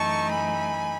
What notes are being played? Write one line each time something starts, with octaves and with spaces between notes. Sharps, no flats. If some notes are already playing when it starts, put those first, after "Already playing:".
Already playing: F#2 E3 A3 D#4 A5 C#6
G#5 B5